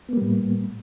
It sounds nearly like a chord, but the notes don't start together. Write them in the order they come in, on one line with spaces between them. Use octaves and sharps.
B3 A#3 G3 A2